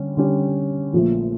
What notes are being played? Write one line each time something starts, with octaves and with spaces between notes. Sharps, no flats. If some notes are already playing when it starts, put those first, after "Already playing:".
Already playing: D3 G3 C#4
D3 G3 C#4 G4
A#1 A#2 F3 A3